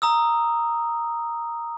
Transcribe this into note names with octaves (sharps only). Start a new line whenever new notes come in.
A#5 D#6 E6